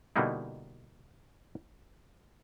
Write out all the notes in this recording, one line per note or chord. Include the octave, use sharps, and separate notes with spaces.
B2 D3 G3 A#3 D#4 E4